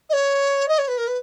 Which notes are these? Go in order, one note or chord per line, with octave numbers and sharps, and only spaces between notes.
D#5
C#5
D#5
C#5
B4
A#4
B4